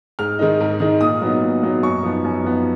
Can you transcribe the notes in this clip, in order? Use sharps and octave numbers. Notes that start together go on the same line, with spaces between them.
G#2 F6
D#3 G#3 D#4
G#2
D#3 G#3 D#4
A#2 D#6
F#3 B3 D#4
A#2
F#3 B3 D#4
F#2 C#6
F3 B3 D#4
F#2
F3 B3 D#4